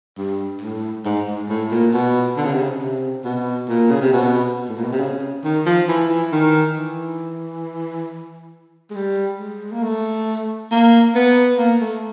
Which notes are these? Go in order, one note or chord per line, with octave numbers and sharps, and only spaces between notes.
G2
A2
G#2
G#2
A2
A#2
B2
D3
C#3
C3
C#3
C3
B2
A#2
C#3
C3
B2
A2
A#2
B2
C3
C#3
D#3
F3
E3
E3
D#3
E3
G#3
G3
G#3
A#3
A3
A#3
B3
A#3
A3